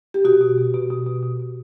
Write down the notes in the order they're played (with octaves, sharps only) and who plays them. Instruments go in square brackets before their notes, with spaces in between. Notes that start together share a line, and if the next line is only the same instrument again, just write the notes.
[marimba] G4
B2 F#4
B2
B2
B2
B2
B2
B2
B2